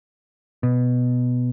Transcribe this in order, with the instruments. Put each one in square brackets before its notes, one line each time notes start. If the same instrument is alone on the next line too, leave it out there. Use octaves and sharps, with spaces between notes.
[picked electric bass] B2